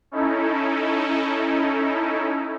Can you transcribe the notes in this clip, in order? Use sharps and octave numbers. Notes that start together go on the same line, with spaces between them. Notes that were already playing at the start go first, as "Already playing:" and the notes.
C#4 D#4 E4 A4